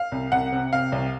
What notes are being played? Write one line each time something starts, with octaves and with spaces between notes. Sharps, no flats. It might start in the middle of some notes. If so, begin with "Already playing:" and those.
Already playing: F5
C2
C2 F#5
C3
C3 F5
C2